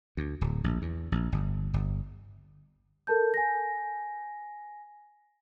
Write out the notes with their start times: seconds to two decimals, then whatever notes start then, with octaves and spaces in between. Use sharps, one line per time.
0.17 D2
0.41 D1
0.64 A#1
0.82 E2
1.12 A#1
1.32 G1
1.74 G1
3.07 A4 A#4 A5 G6
3.34 G#5 A#6